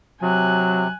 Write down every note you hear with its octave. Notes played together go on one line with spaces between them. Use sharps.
C3 F#3 G#5 F#6